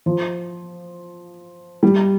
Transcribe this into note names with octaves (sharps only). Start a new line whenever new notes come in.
F3
G3